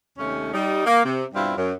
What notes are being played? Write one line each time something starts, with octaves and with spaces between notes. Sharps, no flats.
D#2 C3 A3 C#4
G3 D#4
A#3
C3
G2 B2 G3 C4 E4 F4
F#2